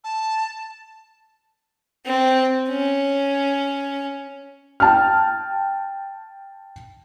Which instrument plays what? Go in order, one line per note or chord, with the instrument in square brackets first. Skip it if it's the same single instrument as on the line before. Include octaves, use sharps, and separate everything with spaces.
[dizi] A5
[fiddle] C4
C#4
[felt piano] G5 A5 F6